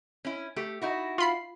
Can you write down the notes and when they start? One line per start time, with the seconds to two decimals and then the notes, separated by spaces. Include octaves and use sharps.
0.25 C#4 E4
0.56 A3 G4
0.82 D#4 E4 F#4
1.18 F4 B5 C7